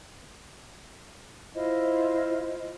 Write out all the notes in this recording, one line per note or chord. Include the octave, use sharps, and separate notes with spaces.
E4 F4 C5 D#5